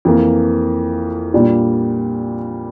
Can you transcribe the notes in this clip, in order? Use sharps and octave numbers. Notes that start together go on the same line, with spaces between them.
F2 E3 A#3
A#2 G3 D4 F4